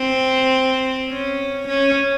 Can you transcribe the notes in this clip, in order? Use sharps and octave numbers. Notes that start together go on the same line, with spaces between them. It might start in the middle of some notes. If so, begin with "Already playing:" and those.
Already playing: C4
C#4
C#4